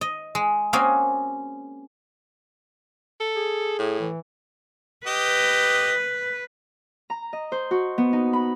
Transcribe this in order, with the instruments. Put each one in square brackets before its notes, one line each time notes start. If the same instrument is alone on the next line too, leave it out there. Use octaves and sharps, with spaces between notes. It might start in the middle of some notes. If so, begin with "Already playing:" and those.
[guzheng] D#5
G#3
A#3 C4 C#4 F#4 G#4
[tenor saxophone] A4
[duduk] G#4
[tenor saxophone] A2
[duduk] E3
[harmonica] G4 D#5 [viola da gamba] B4
[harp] A#5
D#5
C5
F#4
B3
D#4
B5